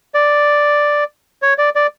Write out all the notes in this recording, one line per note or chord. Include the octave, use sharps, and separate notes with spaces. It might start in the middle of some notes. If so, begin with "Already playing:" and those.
D5
C#5
D5
D5